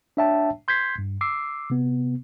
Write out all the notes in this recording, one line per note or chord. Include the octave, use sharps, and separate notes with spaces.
D4 C#5 E5 G5 A5
C6 G6 G#6 B6 C7
G2
D6 E6 C7
C3 B3